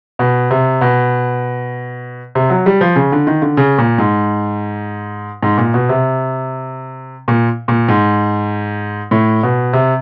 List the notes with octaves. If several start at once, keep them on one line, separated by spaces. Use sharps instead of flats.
B2
C3
B2
C3
F#3
G3
F3
C#3
D3
D#3
D3
C#3
A#2
G#2
G#2
A#2
B2
C3
A#2
A#2
G#2
A2
B2
C3